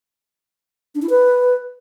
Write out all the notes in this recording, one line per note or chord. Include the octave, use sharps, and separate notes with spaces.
D4
E4
B4